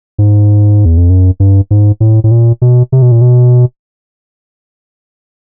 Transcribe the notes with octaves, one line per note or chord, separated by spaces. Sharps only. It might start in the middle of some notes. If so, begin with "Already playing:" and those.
G#2
E2
F2
F#2
G2
G#2
A2
A2
A#2
B2
C3
B2
A#2
B2